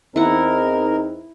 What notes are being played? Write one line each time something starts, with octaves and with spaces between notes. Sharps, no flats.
E2 C4 D#4 E4 A#4 F#5